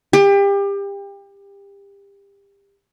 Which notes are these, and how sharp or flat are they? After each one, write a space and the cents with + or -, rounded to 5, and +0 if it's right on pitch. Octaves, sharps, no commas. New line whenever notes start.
G4 +30